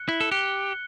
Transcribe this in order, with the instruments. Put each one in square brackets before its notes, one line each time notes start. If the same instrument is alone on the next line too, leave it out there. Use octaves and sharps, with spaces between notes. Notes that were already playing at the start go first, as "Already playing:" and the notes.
Already playing: [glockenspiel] F#6 C#7 G7
[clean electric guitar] E4
A4
[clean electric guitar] G4 [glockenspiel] F#6 C#7 G7